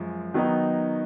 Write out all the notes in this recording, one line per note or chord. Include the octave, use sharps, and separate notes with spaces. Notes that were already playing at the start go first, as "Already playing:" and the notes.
Already playing: F#2 F3 G#3
D#3 F#3 B3 D#4